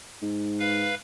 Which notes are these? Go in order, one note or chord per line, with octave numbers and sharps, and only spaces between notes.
G#2
B4 F5